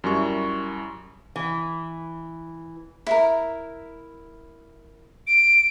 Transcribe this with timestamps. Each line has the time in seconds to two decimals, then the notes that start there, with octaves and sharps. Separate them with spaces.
0.04 F#2 G3 E4 C#6
1.36 E3
3.07 E4 A#4
5.27 D7